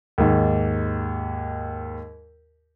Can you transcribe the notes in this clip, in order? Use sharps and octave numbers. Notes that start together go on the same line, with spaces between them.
D#2 G#2